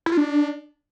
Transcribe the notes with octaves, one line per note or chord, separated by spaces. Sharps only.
E4
F4
D4